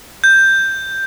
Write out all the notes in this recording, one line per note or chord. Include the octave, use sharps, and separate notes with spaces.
G6